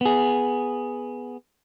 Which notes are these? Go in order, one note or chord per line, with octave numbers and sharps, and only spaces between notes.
B3 G#4